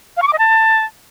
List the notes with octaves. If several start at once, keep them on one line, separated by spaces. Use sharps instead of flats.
F5
C#6
D6
D#5
A5